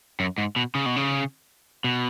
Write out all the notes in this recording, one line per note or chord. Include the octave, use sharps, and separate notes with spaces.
F#2
G#2
B2
C#3
B2
C#3
B2